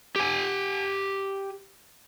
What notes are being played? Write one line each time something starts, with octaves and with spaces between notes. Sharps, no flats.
G4 G#5